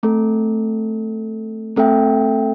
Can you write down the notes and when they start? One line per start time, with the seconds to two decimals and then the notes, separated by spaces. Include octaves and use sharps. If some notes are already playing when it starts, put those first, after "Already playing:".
0.03 A3 C4 A4
1.76 A3 C4 A4 E5 G5